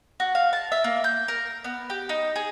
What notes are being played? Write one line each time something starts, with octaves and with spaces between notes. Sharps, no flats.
F#4
F5
A5
E5
A#3
G6
A#4
B3
G4
D#4
G#4